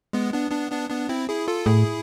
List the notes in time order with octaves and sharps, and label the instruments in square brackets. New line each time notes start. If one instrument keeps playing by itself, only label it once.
[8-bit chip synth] G#3 B3
B3 D4
B3 D4
B3 D4
B3 D4
C4 E4
E4 G#4
F4 A4
[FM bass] A2 [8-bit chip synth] E4 G#4